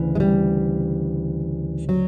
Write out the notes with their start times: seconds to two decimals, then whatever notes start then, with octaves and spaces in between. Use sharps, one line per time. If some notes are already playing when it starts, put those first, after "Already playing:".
Already playing: D2 C#3 E3
0.15 G#3
0.20 G3
1.89 F#3